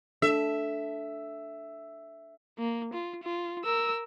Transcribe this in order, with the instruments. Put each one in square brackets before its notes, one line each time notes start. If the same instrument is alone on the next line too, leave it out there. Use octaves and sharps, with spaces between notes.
[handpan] D4 A4 [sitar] E5
[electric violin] A#3
F4
F4
A#4 E6